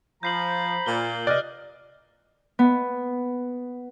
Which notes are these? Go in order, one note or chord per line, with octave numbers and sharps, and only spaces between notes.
F3 C5 A#5 B5 G6 C7 F#7
A#2 G7
G2 C3 E3 D5 D#5 F6 F#6
B3